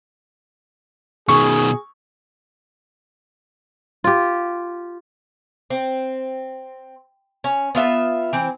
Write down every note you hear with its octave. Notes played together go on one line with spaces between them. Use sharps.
B2 D#3 G#4 C#6
F4 G4
C4
C#4
B3 F4 E5
E3 C4